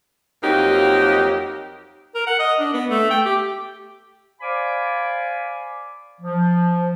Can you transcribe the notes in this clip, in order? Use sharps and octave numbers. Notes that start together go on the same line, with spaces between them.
F2 F#3 A#3 D#4 G4
A#4
F#5
D#5
D4
B3
A3
G5
G4
C5 D5 F5 G#5 B5 D6
F3